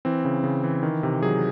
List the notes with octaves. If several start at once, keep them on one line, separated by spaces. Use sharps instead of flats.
E3 C4
C#3
C#3
E3
D#3
C3
F#3 G#4